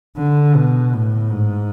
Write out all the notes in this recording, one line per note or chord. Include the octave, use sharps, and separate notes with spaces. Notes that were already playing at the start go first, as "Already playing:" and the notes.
D3
B2
A2
G#2